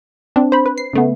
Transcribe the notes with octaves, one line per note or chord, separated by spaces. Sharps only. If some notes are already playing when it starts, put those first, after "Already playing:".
C4 D4
C5 B5
B4
C7
C#3 A3 B3